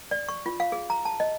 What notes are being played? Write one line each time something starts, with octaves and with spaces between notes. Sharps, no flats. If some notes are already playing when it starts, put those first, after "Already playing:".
D5
C#6
F4
F5
G#4
A#5
A5
D#5